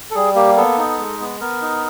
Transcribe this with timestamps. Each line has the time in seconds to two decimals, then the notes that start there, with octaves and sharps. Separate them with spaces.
0.11 A4
0.15 G3 G#4
0.35 A#3 G4
0.57 B3 A4
0.78 D#4
0.99 G#3
1.20 B3
1.41 B3 A#4
1.62 D#4